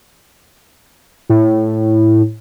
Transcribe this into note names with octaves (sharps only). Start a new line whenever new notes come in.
A2